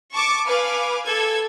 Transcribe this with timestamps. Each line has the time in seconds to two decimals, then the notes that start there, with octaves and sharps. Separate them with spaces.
0.14 A5 C#6 D6
0.46 B4 F5 G#5 D6
1.05 A4 G#6